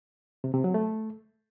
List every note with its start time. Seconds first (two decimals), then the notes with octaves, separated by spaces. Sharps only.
0.44 C3
0.54 C3
0.64 F#3
0.74 A3